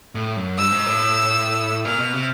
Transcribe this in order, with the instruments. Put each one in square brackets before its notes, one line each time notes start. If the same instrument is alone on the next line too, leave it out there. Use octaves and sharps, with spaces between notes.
[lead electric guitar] A2
F#2
[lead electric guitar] G2 [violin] E6
[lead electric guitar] G#2
A2
[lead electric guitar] A#2 [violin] F6
[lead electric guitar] B2
C3